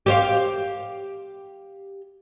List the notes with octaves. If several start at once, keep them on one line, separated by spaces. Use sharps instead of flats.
G4 C5 F5